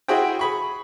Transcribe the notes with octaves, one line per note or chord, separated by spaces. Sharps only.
E4 F#4 G#4 C5 G5
G#4 B5 C#6